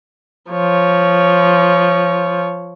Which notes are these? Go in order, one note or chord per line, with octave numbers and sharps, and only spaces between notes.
F3 C#5